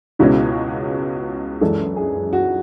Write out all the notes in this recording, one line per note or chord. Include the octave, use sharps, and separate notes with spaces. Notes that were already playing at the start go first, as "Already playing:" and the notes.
C#2 B2 G#3 C#4 E4
F#2 E3 G#3 D4 A4
G#4
F#4